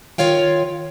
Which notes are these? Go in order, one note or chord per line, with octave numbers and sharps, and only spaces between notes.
D#3 F4 C#5 F5 G5